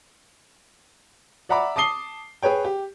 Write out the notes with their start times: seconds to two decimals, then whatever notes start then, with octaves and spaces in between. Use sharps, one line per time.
1.49 D5 E5 F#5 A#5 B5 D6
1.76 A5 D6 D#6 C7 G7
2.42 G#4 B4 C#5 G5
2.65 G4